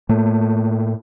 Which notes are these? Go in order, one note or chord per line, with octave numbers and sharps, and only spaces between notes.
A2 A3 A#3